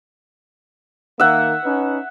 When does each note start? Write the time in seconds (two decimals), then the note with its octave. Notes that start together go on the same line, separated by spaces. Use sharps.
1.20 D#3 A#3 E5 F#5
1.64 C#4 D#4 B4